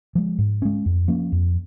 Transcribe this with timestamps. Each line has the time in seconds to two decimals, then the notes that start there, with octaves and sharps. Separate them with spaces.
0.15 F3 G#3
0.38 G#2
0.62 G#3 C#4
0.86 F2
1.08 F3 A#3 C#4
1.32 F2